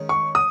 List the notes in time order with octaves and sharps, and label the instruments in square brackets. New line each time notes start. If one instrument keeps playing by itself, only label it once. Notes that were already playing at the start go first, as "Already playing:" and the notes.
Already playing: [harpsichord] D#3 G#3 C#4
[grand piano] C#6
D#6